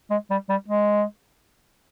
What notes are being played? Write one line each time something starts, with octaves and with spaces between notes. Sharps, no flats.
G#3
G3
G3
G#3